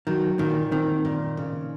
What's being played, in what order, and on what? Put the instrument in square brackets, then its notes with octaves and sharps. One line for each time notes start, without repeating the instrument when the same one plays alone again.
[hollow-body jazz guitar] D#3 [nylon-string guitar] F#3
[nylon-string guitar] A#2 [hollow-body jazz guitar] D#3
[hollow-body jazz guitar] D#3 [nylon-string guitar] C4
[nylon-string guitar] A#2
C#3